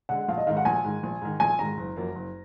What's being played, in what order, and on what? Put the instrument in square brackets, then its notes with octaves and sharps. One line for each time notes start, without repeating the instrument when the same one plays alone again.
[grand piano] D3 G#3 [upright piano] F#5
[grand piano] A#1 [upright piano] F5
[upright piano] D#5
[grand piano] G#2 D#3 [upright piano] F5
[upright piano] F#5
[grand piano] A#1 [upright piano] G#5
[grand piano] G#2 D#3
A#1
G#2 D#3
[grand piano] A#1 [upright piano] G#5
[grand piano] G#2 D#3 [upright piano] A#5
[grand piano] F#1
F#2 F3 A#3
F#1